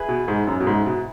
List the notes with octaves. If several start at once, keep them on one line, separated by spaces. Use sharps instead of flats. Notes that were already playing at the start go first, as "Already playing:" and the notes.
Already playing: E4 G#4 B4
B2
G#2
F#2
B2
G#2
B2